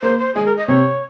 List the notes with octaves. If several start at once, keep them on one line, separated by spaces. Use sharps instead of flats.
A#3 C5
C5
G#3 G#4
A#4
D#5
C3 C#5